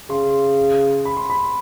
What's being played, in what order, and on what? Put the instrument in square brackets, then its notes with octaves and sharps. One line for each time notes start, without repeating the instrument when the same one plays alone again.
[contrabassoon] C#3 [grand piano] C6
[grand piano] B5
C6
B5